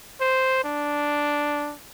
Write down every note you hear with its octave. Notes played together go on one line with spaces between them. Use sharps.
C5
D4